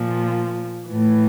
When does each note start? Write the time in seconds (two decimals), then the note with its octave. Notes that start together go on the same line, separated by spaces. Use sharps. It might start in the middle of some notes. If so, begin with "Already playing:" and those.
Already playing: A#2 F3
0.88 A2 E3